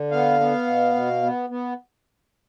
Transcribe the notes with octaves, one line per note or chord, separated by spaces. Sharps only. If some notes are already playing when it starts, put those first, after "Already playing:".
Already playing: D3
B3 F5
B3
B2
B2
B3
B3